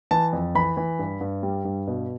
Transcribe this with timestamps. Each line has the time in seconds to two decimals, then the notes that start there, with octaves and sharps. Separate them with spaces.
0.11 E3 A5
0.33 F2
0.55 E3 B5
0.77 E3
0.99 G2
1.21 G2
1.43 G3
1.65 G2
1.88 B2